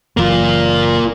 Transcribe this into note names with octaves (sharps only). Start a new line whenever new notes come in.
F#1 E3 F#3 A#3 F4